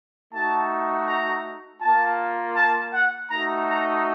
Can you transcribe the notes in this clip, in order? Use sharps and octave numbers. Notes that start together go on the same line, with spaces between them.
A3 D#4 F#4 A5
A#5
A#3 F4 A5
A5
F#5
A3 D#4 F#4 A#5
A#5